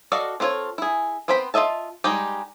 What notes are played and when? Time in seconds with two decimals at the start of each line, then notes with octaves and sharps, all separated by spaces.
0.12 F#4 A4 D5 D#5 F5
0.40 C4 D4 F4 A4 C#5
0.78 E4 G#4
1.28 B3 C4 C5 G5 B5
1.54 F4 F#4 D#5 E5 A5
2.04 G3 G#3 D#4 G4